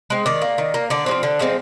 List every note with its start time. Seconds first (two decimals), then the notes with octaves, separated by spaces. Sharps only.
0.10 G#3 C4
0.26 D#3 D5
0.42 A#3
0.58 D#3
0.74 A#3
0.90 D3 D5
1.06 G#3 C4
1.11 F3
1.23 D3
1.39 F3 G#3 C4